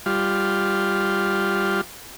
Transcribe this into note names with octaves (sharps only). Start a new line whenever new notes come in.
G3 F4